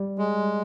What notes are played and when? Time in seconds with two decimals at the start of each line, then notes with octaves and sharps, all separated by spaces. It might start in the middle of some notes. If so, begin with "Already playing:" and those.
Already playing: G3
0.18 G#3